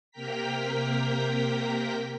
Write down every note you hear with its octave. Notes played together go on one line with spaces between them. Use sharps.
C3 A#3 A#4 G5 A#5 B6